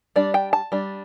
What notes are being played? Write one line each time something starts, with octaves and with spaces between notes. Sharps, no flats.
G3 D4 D5
G5
A5
G3 D4